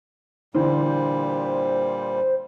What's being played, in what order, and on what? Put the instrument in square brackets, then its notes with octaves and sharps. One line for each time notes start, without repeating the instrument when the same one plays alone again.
[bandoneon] A#2 G3 [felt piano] D3 E3 [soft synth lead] C5